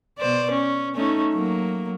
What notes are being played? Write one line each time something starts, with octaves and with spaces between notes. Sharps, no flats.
B2 C5 D5
C#4
A3 C#4 D#4
F#3 A#3